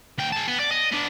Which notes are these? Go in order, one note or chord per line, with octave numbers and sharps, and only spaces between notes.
D2 G5
G#4 A5
B3
D5
D#5
B3 D4